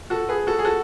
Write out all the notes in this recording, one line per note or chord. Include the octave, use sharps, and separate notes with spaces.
F#4 A4
G#4 B4
F#4 A4
G#4
F#4 A4